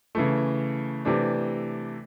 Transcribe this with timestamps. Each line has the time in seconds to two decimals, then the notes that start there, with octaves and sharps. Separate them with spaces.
0.15 C#3 E3 A3
1.05 C3 E3 A3 D4